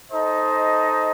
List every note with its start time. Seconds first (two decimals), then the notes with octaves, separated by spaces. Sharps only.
0.11 D#4 A4 C5 D#5